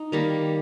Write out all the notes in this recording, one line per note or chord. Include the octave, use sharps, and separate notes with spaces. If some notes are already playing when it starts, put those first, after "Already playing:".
Already playing: D#4
D#3 G3 A#3